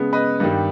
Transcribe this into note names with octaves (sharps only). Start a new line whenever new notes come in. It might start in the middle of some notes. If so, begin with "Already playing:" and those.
Already playing: C#3 G#3 B3
B4 D#5
G2 D#3 G3